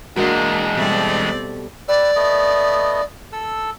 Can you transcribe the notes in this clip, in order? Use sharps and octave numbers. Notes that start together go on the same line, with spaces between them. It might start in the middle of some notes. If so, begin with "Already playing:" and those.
E2 G#3 A#3 D4 F#4 A#4 F#5
B2 G3 A3 C4 D5
G4 B4 D5 E6
A3 B3 D#5
A4 E6